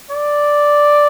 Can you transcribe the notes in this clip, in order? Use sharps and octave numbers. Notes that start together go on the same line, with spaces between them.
D5